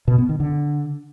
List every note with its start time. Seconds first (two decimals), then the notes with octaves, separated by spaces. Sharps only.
0.08 B2
0.18 B3
0.29 D#3
0.40 D3